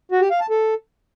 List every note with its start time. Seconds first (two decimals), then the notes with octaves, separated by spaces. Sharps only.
0.11 F#4
0.21 G4
0.31 F5
0.40 A5
0.50 A4